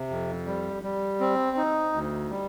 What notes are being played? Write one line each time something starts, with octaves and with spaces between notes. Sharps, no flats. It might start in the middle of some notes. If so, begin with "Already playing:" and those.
Already playing: C3
F2
G3
G3
C4
D#4
D2
G3